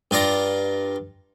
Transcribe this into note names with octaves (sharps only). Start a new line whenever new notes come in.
G2 F4 D5 A#5